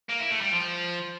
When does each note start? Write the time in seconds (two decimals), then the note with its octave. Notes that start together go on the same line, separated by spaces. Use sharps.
0.09 A#3
0.20 E4
0.30 A3
0.41 G3
0.52 F3